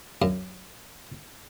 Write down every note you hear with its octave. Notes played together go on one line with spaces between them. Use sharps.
F#2